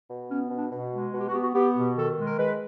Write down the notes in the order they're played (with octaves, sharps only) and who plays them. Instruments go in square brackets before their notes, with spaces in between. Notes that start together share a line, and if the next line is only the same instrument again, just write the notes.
[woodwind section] B2
B3 C#4
B2
D4
B2
G#3
B2 F#4
G4
F#4
B3 G4
F#4
B3 G4
B2
D#3 A4
G#3
A#4
G#3 B4